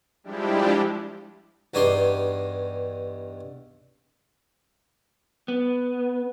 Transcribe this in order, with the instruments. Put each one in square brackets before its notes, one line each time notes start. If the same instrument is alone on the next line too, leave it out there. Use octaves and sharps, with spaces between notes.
[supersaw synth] F3 G3 G#3 D4 E4 G4
[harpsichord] E2 G2 D#4 C#5 D5 C6
[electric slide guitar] B3